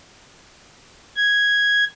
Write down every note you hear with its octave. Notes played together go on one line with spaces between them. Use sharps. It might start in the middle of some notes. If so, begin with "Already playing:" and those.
G#6